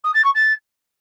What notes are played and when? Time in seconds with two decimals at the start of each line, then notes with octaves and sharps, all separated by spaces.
0.04 D#6
0.14 A6
0.24 C#6
0.34 A6